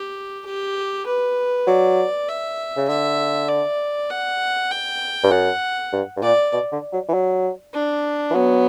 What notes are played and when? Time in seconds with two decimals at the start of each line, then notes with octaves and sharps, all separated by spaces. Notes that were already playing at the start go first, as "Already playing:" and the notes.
Already playing: G4
0.46 G4
1.06 B4
1.67 F#3 D5
2.28 E5
2.77 C#3
2.88 D3 E5
3.49 D5
4.10 F#5
4.71 G5
5.24 G2
5.31 F#2 F#5
5.93 G2
6.17 G2
6.22 A#2 D5
6.53 B2
6.72 D3
6.93 F#3
7.08 E3
7.14 F#3
7.74 D4
8.30 E3
8.34 F#3 B3